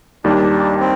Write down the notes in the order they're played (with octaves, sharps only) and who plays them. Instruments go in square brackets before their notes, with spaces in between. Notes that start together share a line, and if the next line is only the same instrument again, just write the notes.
[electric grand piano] D#2 D#3 G3 [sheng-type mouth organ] D4
[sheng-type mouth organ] C4